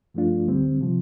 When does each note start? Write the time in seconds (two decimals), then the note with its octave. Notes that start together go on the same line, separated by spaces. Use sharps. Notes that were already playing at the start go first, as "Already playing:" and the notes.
0.14 G2 F3 A3 D4 F4
0.47 D2 D3 G3 C4
0.81 C3 F3